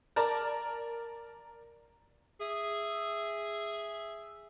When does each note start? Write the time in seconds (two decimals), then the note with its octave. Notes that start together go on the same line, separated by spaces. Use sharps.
0.16 A#4 D5 A5 A#5
2.40 G#4 E5